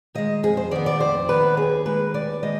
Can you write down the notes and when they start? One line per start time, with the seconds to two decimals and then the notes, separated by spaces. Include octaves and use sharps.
0.15 D#3 G#3 D#5
0.43 F2 G#4
0.57 C5
0.71 D#3 B3 D5
0.86 D5
1.00 F2 C5
1.29 D#3 B3 B4
1.57 D#2 G#4
1.85 D#3 G#3 B4
2.14 D#2 D5
2.42 D#3 G#3 D#5